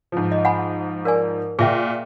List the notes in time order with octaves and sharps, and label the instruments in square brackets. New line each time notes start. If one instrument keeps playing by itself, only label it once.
[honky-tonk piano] G#2 F3
[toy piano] D#5
F#5 G#5 B5
A#4 D5 G#5
[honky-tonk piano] A#2 [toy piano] G#4 E5 G5